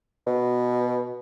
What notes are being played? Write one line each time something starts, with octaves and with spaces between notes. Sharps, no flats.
B2